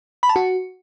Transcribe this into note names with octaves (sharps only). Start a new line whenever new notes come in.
B5
A5
F#4